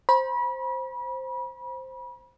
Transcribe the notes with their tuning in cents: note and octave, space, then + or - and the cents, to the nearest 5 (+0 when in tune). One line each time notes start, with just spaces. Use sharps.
C5 +5 B5 -35